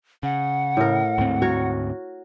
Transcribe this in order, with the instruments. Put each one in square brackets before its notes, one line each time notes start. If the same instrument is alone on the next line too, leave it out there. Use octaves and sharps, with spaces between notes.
[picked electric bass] C#3 [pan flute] F#5
[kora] A2 A#4
[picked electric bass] D2 G#2 C4
[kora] F#4 A#4 C#5